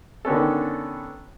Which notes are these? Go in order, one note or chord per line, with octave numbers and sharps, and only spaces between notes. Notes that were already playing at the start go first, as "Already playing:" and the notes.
D3 D#3 B3 C#4 A4